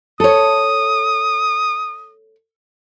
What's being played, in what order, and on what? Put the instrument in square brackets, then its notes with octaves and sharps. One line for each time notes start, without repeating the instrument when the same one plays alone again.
[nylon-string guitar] A4 C#5 [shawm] D#6